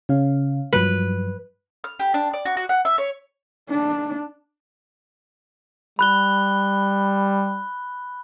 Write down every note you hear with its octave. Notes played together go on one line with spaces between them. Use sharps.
C#3 C#4 F5
G2 F3 F#3 B4
F6
G4
D4
D5
F#4
F#4
F#5
E5
C#5
D4
G3 B5 F#6 G7